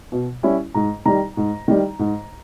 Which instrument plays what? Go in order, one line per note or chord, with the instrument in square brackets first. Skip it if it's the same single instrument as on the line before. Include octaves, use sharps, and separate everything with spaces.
[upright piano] B2
G3 C#4 E4
G#2 A#5
D#3 G3 A#5
G#2
D#3 G3
G#2